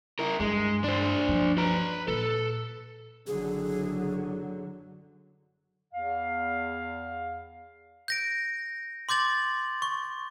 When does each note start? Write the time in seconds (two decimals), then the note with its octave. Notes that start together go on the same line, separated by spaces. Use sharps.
0.19 E4 A#4
0.40 G2 G#3
0.84 D4 C5
1.29 G2 F3
1.58 B4 A#5
2.08 A#2 A4
3.27 F#1 D3 F#3 G#4
5.93 E2 F5
8.08 G6 A#6 D7
9.09 C6 D6 G6 A6 F#7
9.82 C#6